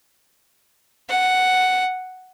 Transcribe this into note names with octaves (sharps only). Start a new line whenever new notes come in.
F#5